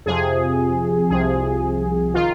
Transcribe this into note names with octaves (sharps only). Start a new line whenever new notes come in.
F2 C3 F3 G#4
C2 C3 F3 G#4
D#3 F4